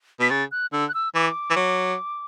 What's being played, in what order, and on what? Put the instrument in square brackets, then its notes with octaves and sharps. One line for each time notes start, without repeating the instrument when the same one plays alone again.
[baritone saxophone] B2 [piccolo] B6
[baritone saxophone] C#3 [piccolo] A6
[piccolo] F#6
[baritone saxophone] D3 [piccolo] E6
[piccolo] F#6
E6
[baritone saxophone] E3 [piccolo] D6
[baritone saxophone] E3
F#3